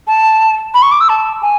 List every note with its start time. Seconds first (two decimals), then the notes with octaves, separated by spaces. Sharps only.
0.07 A5
0.74 B5
0.82 C#6
0.91 D6
1.00 E6
1.09 A5
1.42 G#5